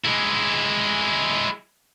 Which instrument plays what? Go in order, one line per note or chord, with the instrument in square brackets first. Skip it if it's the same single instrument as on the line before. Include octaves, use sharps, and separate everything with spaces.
[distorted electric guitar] G#3 E4